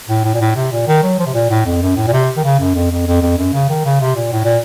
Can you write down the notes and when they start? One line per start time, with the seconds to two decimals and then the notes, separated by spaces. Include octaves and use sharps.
0.09 A2
0.24 A2
0.34 A#2
0.40 A2
0.56 C3
0.71 A#2
0.87 D#3
1.03 F#3
1.19 F3
1.26 C3
1.34 A#2
1.50 A2
1.66 F2
1.82 F#2
1.96 A2
2.07 A#2
2.13 C3
2.37 D#3
2.44 C#3
2.60 F#2
2.75 F2
2.91 F2
3.07 F2
3.22 F2
3.38 F#2
3.53 C#3
3.69 D#3
3.85 C#3
4.01 C3
4.16 A#2
4.32 A2
4.44 A#2